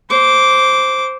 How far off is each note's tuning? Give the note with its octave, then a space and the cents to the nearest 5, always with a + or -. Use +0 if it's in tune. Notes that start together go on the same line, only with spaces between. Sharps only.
C5 +0 D6 -10